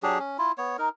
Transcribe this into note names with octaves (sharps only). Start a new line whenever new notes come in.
F#3 D4 G4 G#4
C#4
E4 F4
B3 C#5
D#4 A#4